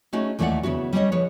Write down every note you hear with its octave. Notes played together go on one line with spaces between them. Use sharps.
A3 C#4 D#4 F#4 G#4
D#2 E3 A3 B4 D5 F#5
C#3 B3 E4 F#4
G3 C#4 G4 A#4 C#5 D#5
F3 G#4 B4 C#5